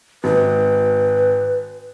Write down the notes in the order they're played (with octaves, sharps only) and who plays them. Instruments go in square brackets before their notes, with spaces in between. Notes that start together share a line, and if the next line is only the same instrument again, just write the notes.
[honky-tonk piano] G#1 [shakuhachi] B4